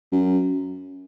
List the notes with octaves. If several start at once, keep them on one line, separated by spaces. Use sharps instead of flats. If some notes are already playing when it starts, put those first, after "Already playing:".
F#2